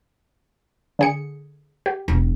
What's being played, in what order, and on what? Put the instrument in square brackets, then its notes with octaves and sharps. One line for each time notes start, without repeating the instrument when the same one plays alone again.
[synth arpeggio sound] D3 G#4 C#7
G4
[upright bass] E1